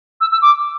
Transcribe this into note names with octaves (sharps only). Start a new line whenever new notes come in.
E6
E6
D6